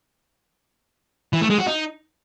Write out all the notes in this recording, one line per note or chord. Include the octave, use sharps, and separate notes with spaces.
E3
A3
G#3
F#4
D#4